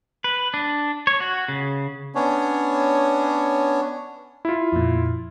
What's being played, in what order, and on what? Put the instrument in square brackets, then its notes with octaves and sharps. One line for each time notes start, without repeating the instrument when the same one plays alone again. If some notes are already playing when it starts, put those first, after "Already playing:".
[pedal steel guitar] B4
D4
C#5
F#4
C#3
[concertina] B3 C#4 D4 C#5
[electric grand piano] E4 F4
[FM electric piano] F2 A#2